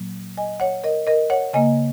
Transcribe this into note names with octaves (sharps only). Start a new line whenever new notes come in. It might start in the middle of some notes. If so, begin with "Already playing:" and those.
Already playing: A#2 F#3 A#3
D#5 G#5
C#5 F#5
A#4 D#5
A#4 D#5
C#5 F#5
C#3 A#3 D#5 G#5